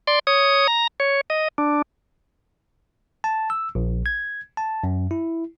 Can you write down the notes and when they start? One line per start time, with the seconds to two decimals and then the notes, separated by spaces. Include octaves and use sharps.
0.07 D5 C6
0.27 C#5 D#6
0.68 A#5
1.00 C#5
1.30 D#5
1.58 D4
3.24 A5
3.50 E6
3.75 A#1
4.06 G#6
4.57 A5
4.84 F#2
5.11 E4